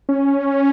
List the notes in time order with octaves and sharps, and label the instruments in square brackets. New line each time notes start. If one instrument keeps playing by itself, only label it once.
[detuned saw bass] C#4